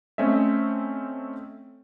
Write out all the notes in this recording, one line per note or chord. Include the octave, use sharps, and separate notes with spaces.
A3 C4 C#4 D#5 E5